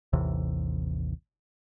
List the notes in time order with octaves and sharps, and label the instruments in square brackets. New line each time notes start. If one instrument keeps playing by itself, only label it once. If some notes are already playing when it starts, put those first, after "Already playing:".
[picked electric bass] A1 D#2 C3 E3